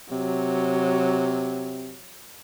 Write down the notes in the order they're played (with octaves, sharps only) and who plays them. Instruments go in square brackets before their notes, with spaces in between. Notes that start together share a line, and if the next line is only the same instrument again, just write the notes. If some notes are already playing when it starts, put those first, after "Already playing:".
[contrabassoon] C3 [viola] F#3